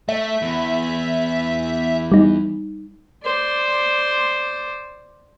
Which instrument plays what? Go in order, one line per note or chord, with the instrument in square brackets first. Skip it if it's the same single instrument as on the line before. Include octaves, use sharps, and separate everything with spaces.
[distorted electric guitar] A3 [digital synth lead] E5
[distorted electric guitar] E2
[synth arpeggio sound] G3 D#4
[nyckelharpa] C5 D5